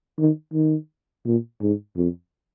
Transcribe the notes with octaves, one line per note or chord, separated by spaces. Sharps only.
D#3
D#3
A#2
G#2
F2